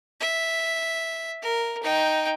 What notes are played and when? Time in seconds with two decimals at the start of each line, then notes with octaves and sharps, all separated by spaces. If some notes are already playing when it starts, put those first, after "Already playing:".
0.20 E5
1.42 A#4
1.83 D#4 G5